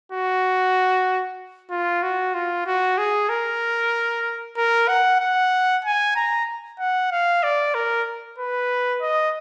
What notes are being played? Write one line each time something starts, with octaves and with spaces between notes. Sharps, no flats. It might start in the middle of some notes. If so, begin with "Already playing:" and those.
F#4
F4
F#4
F4
F#4
G#4
A#4
A#4
F#5
F#5
G#5
A#5
F#5
F5
D5
A#4
B4
D#5